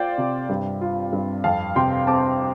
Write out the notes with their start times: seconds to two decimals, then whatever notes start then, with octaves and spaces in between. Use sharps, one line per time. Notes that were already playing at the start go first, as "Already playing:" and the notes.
Already playing: F4 C5 D5 F5 G5
0.18 C3
0.49 G2
0.81 F4
1.13 G2
1.44 F2 F5 A5
1.76 C3 G5 C6
2.07 C4 A5 D6